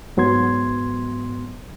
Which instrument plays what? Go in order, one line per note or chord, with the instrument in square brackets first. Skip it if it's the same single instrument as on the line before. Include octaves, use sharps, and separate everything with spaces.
[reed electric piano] G#2 F#3 B3 C6 G#6